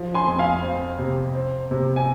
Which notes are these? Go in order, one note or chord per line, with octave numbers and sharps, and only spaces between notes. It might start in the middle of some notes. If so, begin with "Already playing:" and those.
Already playing: F3
G#5 C6
F2
F5 G#5
C4
C3
C4
C3
G#5